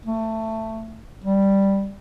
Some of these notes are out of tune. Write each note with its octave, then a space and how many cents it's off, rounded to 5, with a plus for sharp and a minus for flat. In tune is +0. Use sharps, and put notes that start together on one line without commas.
A3 +15
G3 +0